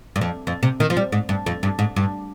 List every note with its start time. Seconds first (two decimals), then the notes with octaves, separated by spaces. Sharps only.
0.16 G2
0.21 F2
0.47 F2
0.63 C3
0.80 D#3
0.90 F3
0.97 G3
1.12 G#2
1.29 G2
1.46 F2
1.63 G2
1.79 G#2
1.96 G2